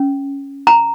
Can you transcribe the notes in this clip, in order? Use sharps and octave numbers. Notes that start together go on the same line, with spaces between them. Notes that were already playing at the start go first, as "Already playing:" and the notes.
Already playing: C#4
A#5